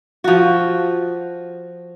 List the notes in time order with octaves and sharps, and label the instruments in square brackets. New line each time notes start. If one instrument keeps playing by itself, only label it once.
[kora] F3 F#4